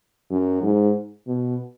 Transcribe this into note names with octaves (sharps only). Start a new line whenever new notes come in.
F#2
G#2
B2